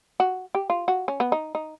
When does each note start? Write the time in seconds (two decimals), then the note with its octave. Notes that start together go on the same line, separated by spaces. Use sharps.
0.20 F#4
0.55 G4
0.70 F4
0.88 F#4
1.08 C#4
1.20 B3
1.32 D#4
1.55 D#4